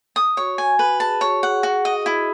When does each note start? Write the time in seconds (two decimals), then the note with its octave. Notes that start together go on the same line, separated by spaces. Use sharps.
0.16 D#6
0.37 F#4 C#5
0.58 G#5
0.79 B4
0.89 F#4
1.00 G#4 A5
1.21 F#4 C#5
1.43 G#4 F#5
1.63 F#4
1.85 D#5
2.06 E4